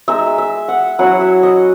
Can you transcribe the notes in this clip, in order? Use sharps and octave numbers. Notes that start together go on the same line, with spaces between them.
G#3 D#4 E5
E5
F#5
F#3 C#4 E4 F#5
E5
D#5